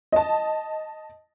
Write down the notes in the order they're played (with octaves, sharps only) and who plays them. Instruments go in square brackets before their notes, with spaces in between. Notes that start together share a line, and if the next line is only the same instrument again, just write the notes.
[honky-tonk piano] D#5 A5